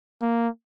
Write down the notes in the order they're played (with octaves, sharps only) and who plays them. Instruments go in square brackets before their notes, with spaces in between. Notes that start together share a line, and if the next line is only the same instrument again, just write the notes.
[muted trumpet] A#3